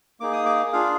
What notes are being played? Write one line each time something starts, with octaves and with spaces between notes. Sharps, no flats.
A#3 D#4 G#4 D6
D#6
D6
D4 F4 G#4 F5